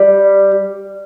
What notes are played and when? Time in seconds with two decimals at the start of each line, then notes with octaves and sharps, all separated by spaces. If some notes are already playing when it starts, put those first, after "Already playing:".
Already playing: G3